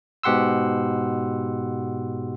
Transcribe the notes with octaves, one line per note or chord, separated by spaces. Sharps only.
G#2 B2 G4 F#5 C6 E6